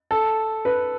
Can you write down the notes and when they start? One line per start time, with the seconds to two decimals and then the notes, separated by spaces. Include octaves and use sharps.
0.11 A4
0.65 B4